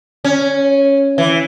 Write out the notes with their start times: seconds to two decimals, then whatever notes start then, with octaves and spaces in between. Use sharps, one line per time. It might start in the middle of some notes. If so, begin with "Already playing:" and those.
0.24 C#4
1.18 E3